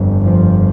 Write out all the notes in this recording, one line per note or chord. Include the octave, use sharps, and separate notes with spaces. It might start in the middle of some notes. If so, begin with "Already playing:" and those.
Already playing: G1 F2
F3